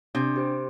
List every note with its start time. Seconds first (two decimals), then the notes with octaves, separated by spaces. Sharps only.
0.15 C3 D4
0.36 G4 C5